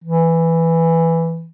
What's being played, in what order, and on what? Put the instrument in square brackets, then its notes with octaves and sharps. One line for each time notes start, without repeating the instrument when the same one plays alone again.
[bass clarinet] E3